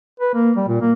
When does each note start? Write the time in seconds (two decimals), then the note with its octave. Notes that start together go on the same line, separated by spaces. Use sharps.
0.20 B4
0.34 A#3
0.56 G3
0.68 A#2
0.81 A#3